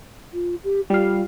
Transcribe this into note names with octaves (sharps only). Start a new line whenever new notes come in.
F4
G4
G3 F4 F5